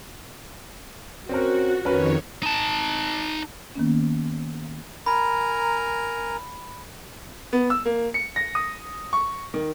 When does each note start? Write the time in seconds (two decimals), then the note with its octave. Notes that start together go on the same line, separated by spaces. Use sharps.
1.29 C4 C#4 F#4 A#4
1.85 F2 D#3 C#4 A#4 B4 C#5
2.43 D#4 A5
3.75 D#3 A#3 B3 C#4
5.06 A#4 G#5 A#5 B5
7.53 B3
7.70 E6
7.85 A#3
8.14 C#7
8.36 A#6
8.55 D#6
9.13 C#6
9.54 D#3